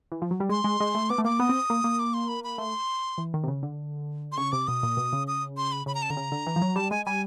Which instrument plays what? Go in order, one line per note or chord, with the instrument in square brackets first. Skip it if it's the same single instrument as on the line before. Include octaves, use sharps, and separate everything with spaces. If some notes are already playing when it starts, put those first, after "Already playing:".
[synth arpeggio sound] E3
F3
F#3
G3
[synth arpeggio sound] G#3 [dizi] C6
[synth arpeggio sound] G#3
G#3
A3
[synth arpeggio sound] B3 [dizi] D6
[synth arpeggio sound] A3
[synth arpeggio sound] A#3 [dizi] D6
[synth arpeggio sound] B3 [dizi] D#6
[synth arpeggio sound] C4
A#3
A#3
[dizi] D6
C6
B5
B5
[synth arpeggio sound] A3 [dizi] C6
[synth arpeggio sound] E3
D#3
C3
C#3
D3
[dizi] C6
[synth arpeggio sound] C#3 [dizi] C#6
[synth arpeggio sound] C3 [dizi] D6
[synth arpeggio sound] B2 [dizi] D#6
[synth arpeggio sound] A#2
B2
C#3
[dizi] D#6
C6
B5
[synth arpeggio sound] C#3 [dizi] B5
[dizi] A#5
A5
[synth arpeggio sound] D3 [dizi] A#5
[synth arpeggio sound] C#3
D3
E3
F3
F#3
[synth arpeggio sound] G3 [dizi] A5
[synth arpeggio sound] G#3 [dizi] G#5
[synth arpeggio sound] G3 [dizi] G#5